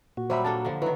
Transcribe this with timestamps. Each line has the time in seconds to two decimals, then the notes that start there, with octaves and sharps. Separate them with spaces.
0.17 A#2 F#4
0.30 F#3 G3 C5 E5 B5
0.44 A#3 D4 A4 A5
0.65 D3 F3
0.82 D#3 F#3 E4 B4